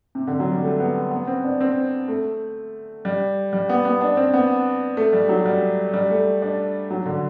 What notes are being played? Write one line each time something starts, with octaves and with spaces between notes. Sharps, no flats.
C3
D3
F#3
G3
A3
B3
B3
C4
D4
C4
A3
G3
G3
B3
B3
D4
C4
B3
A3
G3
F#3
G3
G3
A3
D4
F#3
D3